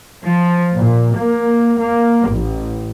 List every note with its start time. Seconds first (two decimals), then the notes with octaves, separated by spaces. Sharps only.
0.26 F3
0.76 A#2
1.16 A#3
1.79 A#3
2.28 A1